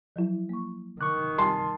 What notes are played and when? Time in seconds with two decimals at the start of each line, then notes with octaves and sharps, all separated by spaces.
0.16 F3 F#3 E4
0.49 A#3 C#6
1.01 D#3 C#6 D6 F#6
1.38 G3 G#5 A5 C6 D6